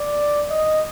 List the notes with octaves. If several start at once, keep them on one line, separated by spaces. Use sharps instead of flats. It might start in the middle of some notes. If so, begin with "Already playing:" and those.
Already playing: D5
D#5